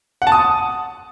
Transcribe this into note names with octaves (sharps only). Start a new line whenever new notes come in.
F#5
A5
D#6